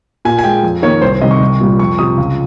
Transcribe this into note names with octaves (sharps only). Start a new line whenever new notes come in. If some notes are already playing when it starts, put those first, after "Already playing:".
A#2 G#5
G#5
G#3 G5
F2
D#3 A#3 C#5
C2 C5
C5
C3 D#3 G3 D#5
C#6
C2
A#2 G3
F2 C#6
C3 F3 D#6
C#2